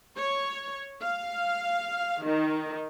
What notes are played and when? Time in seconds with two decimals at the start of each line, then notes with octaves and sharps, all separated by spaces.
0.17 C#5
1.01 F5
2.25 D#3